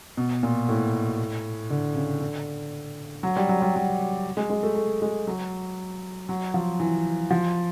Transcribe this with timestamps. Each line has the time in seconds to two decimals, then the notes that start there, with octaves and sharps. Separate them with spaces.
0.17 B2
0.43 A#2
0.68 A2
1.70 D3
1.95 C#3
2.20 D3
3.23 F#3
3.37 G3
3.49 F#3
3.62 G3
3.76 F#3
4.37 G#3
4.50 G#3
4.63 A3
4.75 A3
5.02 G#3
5.27 F#3
6.29 F#3
6.54 F3
6.80 E3
7.31 F3